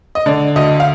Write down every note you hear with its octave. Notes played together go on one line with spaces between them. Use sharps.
D#5
D3 D5
D2 D#5
F5